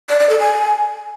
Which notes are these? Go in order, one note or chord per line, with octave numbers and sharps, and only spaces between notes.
D5
D5
A4
G#5